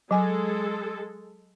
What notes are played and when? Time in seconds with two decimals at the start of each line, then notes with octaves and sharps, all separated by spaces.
0.11 F#3 G#3 A4 G#5